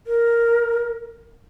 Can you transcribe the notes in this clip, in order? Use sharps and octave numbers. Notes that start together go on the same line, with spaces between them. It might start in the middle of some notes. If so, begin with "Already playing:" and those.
A#4